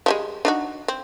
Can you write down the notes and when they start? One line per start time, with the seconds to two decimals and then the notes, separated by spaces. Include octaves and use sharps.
0.06 F3 G3 G#3
0.45 D4 D#4 F#4
0.88 C4